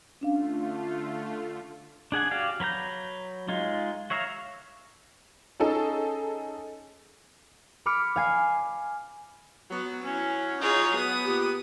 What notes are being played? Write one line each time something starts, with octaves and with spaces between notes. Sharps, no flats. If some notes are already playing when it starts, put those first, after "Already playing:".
D3 A3 C#4 D4 F4 F5
D4 G#4 F#5 G#5
F#4 G4 D5 F5
F#3 B4 A#5 G6
G#3 D#4 F4
F#4 C#5 E5 F5 A#5
C#4 D#4 G#4 A4
B5 D6 F6 C#7
F5 G#5 C7
F#3 B3
C#4 E4
D#4 F4 G#4 C#5
B3 B4 D#6
A#2 G4